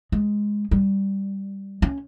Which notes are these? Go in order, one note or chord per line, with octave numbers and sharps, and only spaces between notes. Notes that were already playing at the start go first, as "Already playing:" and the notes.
G#3
G3
C#4